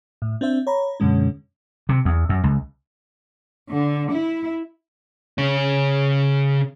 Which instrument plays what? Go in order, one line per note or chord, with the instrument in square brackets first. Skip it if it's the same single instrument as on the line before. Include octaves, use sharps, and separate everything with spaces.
[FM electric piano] A2
C4 D4 C5 E5
C#5 A#5 B5
F#2 B2 D3 G#3 C#4
[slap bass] C3
E2
F#2
C#2
[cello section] D3
E4
[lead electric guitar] C#3 C#4